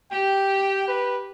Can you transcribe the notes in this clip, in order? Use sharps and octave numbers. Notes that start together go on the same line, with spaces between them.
G4 G5
B4